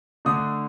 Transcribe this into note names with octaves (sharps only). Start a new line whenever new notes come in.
D3 A3 D4 D#6